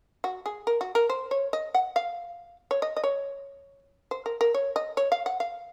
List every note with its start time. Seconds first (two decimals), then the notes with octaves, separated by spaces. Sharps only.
0.24 F#4
0.46 G#4
0.67 A#4
0.81 F#4
0.95 A#4
1.10 C5
1.31 C#5
1.53 D#5
1.75 F#5
1.96 F5
2.71 C#5
2.82 D#5
2.97 D#5
3.04 C#5
4.11 C5
4.26 A#4
4.41 A#4
4.54 C#5
4.76 D#5
4.97 C#5
5.12 F5
5.26 F#5
5.40 F5